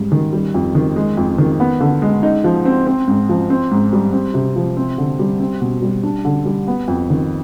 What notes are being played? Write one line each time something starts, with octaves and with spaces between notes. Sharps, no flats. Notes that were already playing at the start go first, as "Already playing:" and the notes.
Already playing: G#2 G3
D#3
G3
F2
D#3
G#3
F2
D#3
B3
D3
G#3
D#4
F3
C4
C4
G#2
F3
C4
G#2
G3
C4
C3
F3
C4
D3
G3
C4
B2
G3
D4
D3
G3
B3
F2
D#3